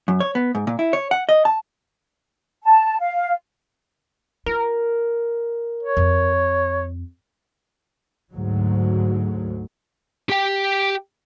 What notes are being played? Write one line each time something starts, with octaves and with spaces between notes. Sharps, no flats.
F#2
C#5
B3
G#2
A#2
E4
C#5
F#5
D#5
A5
A5
F5
F4 A#4
C#5
F2
D2 G#2 F#3
G4 G5